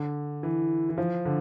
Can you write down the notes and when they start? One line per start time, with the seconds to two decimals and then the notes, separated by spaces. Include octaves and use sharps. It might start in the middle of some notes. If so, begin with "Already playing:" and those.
Already playing: D3
0.43 E3
0.89 E3
0.98 F3
1.25 D3